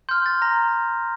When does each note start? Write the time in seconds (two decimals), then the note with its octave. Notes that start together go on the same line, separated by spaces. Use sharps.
0.09 C6 F6 G6
0.26 A6
0.42 A#5 A#6